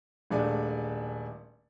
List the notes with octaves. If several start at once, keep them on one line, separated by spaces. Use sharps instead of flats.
D#1 G#3 A3 D4 D5 G#5